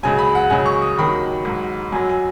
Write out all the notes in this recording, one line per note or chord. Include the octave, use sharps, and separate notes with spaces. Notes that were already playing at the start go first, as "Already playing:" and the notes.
C#2 C#3 F#3 G#5
B5
F#5
C#2 C#3 F#3 G#5
C#6
D#6
D#2 D#3 F#3 B5
G#2 F#3
F#2 F#3 G#5
G#5